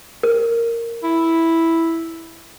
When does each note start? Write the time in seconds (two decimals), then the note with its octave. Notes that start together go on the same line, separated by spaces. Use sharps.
0.23 A#4
1.04 E4